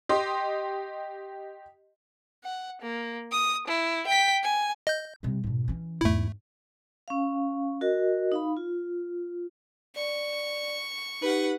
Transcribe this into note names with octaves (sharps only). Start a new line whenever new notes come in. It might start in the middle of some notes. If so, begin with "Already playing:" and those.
G4 D#5 C6
F#5
A#3
D#6
E4
G5 B6
G#5
D#5 G6
C3 G3
G#2 B2
E3 C#4
E2 G#2 A3 E4
C#4 F5
F#4 A#4 D#5
D#4 F5 B5
F4
D5 C#6
D#4 G4 B4 F#5